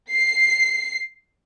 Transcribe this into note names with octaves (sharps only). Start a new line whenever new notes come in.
C7